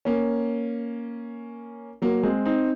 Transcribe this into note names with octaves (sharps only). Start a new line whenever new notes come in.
A#3 C#4
F#3 A#3
G#3 C4
C4 D#4